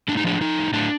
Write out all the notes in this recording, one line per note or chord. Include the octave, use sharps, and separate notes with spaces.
A2 D4
D#4
F3 D4
F3 D#4
A2
A2 D4